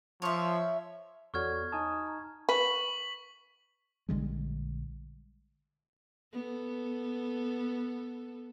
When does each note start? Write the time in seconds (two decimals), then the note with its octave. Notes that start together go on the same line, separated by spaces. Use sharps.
0.22 F3 C#5 E5
1.34 E2 F#4 A4 C#5 D5 C#6 F6 G#6
1.72 D#4 G#5 A5 D#6
2.07 A#5
2.49 B4 C#6 B6 F#7
4.09 A#1 D3 G3 G#3
6.32 B3 A4